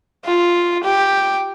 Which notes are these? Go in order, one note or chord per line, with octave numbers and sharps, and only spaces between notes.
F4
G4